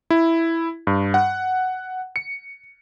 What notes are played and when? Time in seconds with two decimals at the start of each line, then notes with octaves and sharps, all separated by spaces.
0.10 E4
0.87 G2
1.14 F#5
2.16 C#7